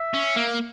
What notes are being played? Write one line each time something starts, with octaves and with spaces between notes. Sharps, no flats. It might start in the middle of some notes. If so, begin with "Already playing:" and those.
Already playing: E5
C#4
A#3